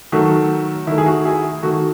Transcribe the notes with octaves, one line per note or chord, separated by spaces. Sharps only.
D#3 F#3 A3 F#4
D#3 A3 E4
G#4
F#4
E4 G#4
D#3 A3 F#4